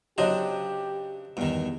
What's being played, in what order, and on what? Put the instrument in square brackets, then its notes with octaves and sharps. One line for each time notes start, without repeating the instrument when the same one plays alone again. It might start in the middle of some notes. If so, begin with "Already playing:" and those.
[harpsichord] C#3 D4 C5 [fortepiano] F#3 D#5 [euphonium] G4
[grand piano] E2 [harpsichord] G2 D#3